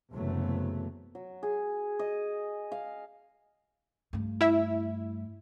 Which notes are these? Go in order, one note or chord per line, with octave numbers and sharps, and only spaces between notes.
F#1 C3 E3 F#3 A3 B3
F#3
G#4
D#5
F5
G2 A3
E4 E5